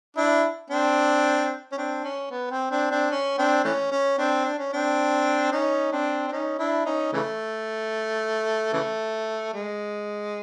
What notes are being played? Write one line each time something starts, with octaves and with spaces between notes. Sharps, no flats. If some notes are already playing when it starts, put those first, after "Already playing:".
D4 E4
C4 D4
C#4
C4 D4
C#4
B3
C4
C4 D4
C4 D4
C#4
C4 D4
E3 A3 C#4
C#4
C4 D4
D4
C#4
C4 D4
C#4 D#4
C4 D4
D4
C#4 D#4
D4 E4
C#4 D#4
C#3 E3 A3
C#3 E3 A3
G#3